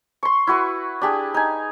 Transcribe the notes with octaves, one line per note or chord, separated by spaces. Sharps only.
C6 C#6
E4 F#4 B4
D4 G4 G#4
D#4 G#5